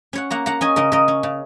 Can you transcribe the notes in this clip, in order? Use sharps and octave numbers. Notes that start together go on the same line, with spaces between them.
C#4 C#5 F#5
A#3 F#5 A#5
A#3 F#5 A#5
C#4 D#5 G#5
C#3 A#4 D#5
C#3 A#4 D#5
C#4
C#3